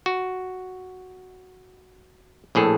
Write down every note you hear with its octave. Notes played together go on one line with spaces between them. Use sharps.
F#4
A#1 A2 G#4 A4